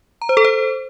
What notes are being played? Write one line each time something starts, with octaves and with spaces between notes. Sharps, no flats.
A#5
C5
A4
C5